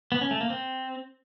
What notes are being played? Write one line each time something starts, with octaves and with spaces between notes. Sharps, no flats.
B3
C#4
A3
A#3
C4